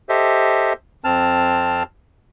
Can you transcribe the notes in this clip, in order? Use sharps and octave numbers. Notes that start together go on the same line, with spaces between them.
G4 A4 C5 D#5 E5
F2 C4 A5 F6